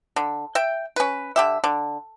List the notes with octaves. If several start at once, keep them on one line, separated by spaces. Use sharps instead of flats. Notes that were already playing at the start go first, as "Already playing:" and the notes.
D3
E5 G5
C#4 B4
D3 G4 E5
D3